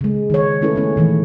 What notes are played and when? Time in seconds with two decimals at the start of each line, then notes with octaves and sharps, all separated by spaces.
0.01 C#3 G#3
0.30 D#3 C#5
0.62 A3 C#4 E4 A4 B4
0.75 A3 B3 C#4 E4
0.96 A#2 D#3 E3 A3